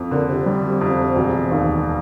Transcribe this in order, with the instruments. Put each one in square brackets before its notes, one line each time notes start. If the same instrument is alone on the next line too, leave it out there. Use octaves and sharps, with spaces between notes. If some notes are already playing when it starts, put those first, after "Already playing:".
Already playing: [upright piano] F2
[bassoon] A#2 [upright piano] D3
[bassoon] C3
[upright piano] G3
F2
E1
D#2